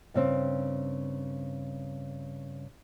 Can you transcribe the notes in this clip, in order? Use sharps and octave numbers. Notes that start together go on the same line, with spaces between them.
G2 C#3 C4